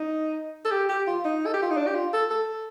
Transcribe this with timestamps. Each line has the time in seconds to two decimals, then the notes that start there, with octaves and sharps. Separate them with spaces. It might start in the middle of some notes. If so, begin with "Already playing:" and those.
Already playing: D#4
0.65 A4
0.72 G4
0.89 G4
1.07 F4
1.25 D#4
1.46 A4
1.54 G4
1.62 F4
1.70 D#4
1.77 D4
1.87 G4
1.95 F4
2.13 A4
2.31 A4